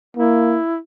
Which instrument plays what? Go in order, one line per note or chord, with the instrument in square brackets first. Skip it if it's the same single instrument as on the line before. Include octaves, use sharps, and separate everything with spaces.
[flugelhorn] A#3 [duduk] E4